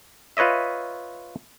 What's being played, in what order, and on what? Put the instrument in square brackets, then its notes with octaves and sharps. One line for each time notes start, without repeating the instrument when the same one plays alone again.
[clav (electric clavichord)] F4 B4 C#5 D#5 E5